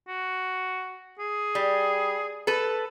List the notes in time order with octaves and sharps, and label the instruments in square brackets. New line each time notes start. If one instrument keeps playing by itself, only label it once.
[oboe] F#4
G#4
[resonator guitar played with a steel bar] G3
A4 B4